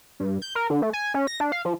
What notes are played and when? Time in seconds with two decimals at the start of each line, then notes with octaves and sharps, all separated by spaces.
0.20 G2
0.42 G6
0.55 A#4
0.70 D3
0.82 A3
0.93 G#5
1.14 C#4
1.27 A#6
1.40 D4
1.52 F5
1.65 F3